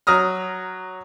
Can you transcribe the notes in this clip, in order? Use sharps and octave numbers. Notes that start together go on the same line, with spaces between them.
F#3 A#5 D#6 F6